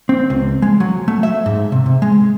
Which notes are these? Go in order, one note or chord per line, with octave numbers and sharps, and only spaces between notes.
C4
C#2
G#3
F#3
A3
E5
G#2
C3
C3
G#3